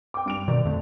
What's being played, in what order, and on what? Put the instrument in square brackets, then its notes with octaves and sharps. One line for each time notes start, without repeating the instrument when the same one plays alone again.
[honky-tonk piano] G5 D6
G2 D7 F7
[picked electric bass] B2 D#3 [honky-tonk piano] D5
[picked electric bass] F2 D3 A3